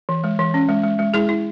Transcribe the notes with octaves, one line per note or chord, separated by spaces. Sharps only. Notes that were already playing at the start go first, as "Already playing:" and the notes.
E3
G#3
E3
C#4
G#3
G#3
G#3
G#3 E4 G#4
E4